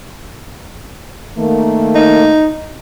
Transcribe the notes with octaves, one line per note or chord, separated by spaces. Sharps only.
D#3 A3 A#3
D#4